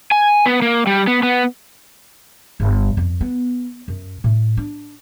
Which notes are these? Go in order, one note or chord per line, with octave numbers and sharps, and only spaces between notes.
G#5
B3
A#3
G3
B3
B3
G1
F2
B3
F#2
A2
D4